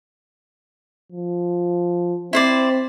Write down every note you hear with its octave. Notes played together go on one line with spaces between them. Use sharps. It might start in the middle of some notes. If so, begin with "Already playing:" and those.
F3
C4 E4 C5 D5